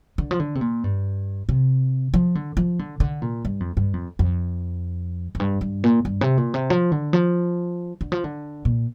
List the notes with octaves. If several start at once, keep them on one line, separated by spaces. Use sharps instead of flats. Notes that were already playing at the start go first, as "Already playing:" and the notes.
D3
F3
D3
C3
A#2
G2
C3
F3
D3
F3
D3
D3
A#2
G2
F2
G2
F2
F2
F2
G2
G2
A#2
G2
C3
A#2
C3
F3
D3
F3
D3
F3
D3
A#2